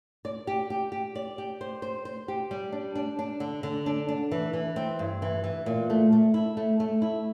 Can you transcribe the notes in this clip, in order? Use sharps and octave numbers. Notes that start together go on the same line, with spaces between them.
D5
G4
G4
G4
D5
G4
C5
C5
C5
G4
G3
D4
D4
D4
D3
D3
D4
D4
E3
E3
C4
G2
E3
E3
A#2
A3
A3
E4
A3
A3
E4